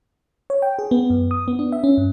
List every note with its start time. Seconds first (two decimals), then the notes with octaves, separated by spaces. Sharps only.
0.50 C#5
0.62 G5
0.79 G#4
0.91 B3
1.10 F#2
1.31 D#6
1.48 B3
1.59 D4
1.72 E5
1.84 C#4
1.98 G2